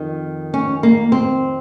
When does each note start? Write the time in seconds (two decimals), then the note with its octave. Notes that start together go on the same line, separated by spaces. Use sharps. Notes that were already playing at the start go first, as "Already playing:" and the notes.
Already playing: F2 D#3
0.54 C#4
0.83 A#3
1.12 C4